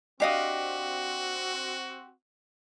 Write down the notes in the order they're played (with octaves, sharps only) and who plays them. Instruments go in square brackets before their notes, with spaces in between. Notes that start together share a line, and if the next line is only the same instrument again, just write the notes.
[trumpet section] C4 F#4 [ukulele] D4 D#5 [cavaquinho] G4 F5 D#6